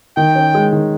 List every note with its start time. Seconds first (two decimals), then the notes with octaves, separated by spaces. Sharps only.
0.17 D#3 G5
0.35 C#4
0.55 G#3
0.73 D#3